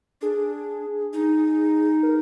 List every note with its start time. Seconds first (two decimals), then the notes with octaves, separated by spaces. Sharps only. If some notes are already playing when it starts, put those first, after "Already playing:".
0.22 D4 G#4
1.13 D#4
2.03 A#4